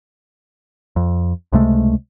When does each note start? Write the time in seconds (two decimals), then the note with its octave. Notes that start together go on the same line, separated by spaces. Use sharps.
0.96 F2
1.52 C#2 C3 G#3 A3